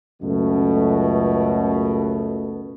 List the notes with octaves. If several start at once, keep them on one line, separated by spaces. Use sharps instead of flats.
C#2 F#2 B2 A3